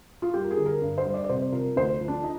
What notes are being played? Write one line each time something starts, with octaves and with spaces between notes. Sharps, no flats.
F4
G3 G4
A#4
G#4
D3
A#4
G2
C5
G3
D5
D5
C3 C5
F3 A#4
D2 C5
F3
D4
D#4